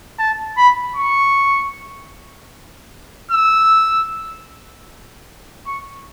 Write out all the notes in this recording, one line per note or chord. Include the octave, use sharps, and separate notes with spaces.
A5
B5
C#6
E6
C#6